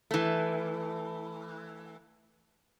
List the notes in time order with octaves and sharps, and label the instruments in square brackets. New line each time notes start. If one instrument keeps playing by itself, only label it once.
[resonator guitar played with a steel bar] E3 A3